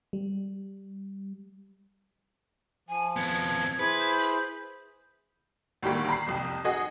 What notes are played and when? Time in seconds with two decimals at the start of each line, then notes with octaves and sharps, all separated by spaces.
0.13 G3
2.89 F3 G#5
3.16 F2 B3 G#6
3.79 E4 G#4 B4 C5
4.00 G6
5.83 D2 A2 D#3 G3 A#3
6.09 A#5 B5 C7
6.26 C2 F2 C3
6.64 F#4 G#4 D#5 F#5